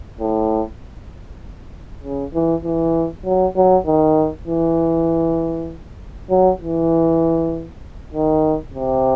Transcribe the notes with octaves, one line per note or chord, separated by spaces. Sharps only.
A2
C#3
E3
E3
F#3
F#3
D#3
E3
F#3
E3
D#3
C3